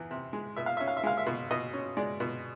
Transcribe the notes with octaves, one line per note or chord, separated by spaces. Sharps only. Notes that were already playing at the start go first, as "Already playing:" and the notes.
Already playing: E2 E3
C3
G#3
B2 E5
F5
C#4 E5
F5
E5
G#3 F5
E5
B2
B2 D#5
C#4
G#3 D5
B2